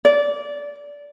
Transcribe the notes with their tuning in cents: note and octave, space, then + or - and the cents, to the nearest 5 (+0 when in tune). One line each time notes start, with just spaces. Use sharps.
D5 -20